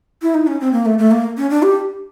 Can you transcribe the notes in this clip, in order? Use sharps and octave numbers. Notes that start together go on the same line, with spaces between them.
E4
D#4
C#4
C4
A#3
A3
A3
A#3
C#4
D4
G4